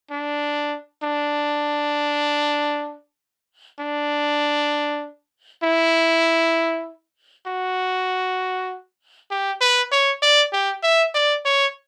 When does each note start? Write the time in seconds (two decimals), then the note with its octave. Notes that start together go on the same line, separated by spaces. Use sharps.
0.11 D4
1.03 D4
3.79 D4
5.63 E4
7.47 F#4
9.31 G4
9.61 B4
9.92 C#5
10.22 D5
10.52 G4
10.83 E5
11.14 D5
11.45 C#5